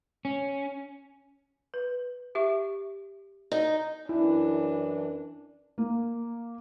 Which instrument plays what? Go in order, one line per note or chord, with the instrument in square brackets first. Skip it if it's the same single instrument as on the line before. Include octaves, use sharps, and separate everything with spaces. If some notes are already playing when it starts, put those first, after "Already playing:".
[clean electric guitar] C#4
[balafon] B4
G4 E5 C#6
[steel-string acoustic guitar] D#4
[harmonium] F#2 E3 [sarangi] D4 [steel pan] E4
[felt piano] A#3